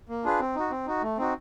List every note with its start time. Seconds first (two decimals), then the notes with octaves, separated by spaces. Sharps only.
0.09 A#3
0.24 D4 F4 G#4 B4
0.40 C4
0.56 D#4 F#4
0.71 C4
0.86 D#4 F#4
1.02 A3
1.18 C4 D#4 F#4